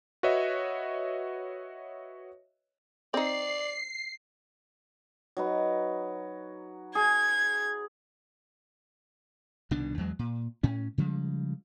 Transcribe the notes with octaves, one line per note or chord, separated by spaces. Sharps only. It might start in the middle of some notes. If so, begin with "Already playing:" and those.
F#4 B4 C#5 D#5 E5
C4 D#4 D5 C7
F#3 D#4 B4
G#4 G#6
C2 B2 D#3 D4
E2 F#3 G#3
A#2
A2 C#4
C#3 F3 G3 G#3